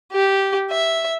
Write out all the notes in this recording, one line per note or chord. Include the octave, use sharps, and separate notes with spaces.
G4
E5